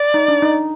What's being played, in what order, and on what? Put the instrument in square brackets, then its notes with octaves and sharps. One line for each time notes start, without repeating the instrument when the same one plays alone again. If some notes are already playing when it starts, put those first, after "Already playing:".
Already playing: [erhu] D5
[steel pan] D#4
D4
D#4